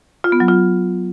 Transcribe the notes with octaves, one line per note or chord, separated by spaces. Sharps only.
F4
B3
F#3
F4